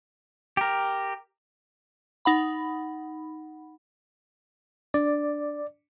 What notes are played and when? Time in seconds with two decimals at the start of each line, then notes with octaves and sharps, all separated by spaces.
0.57 G4 A#4
2.25 D#4 F#5 B5
4.94 D4 D5